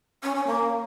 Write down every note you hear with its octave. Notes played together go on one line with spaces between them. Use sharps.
C#4
C#4
A#3